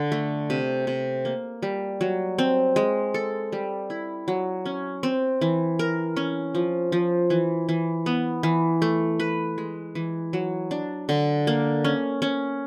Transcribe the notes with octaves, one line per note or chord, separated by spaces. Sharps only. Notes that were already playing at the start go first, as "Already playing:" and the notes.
Already playing: D3
A3
C3
C3
A#3
G3
F#3
C4
G#3
A4
G3
E4
F#3
C#4
C4
E3
A#4
C#4
F3
F3
E3
E3
B3
E3
A3
B4
G#3
E3
F#3
D4
D3
A#3
C#4
C#4